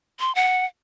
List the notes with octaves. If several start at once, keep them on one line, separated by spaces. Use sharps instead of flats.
C6
F#5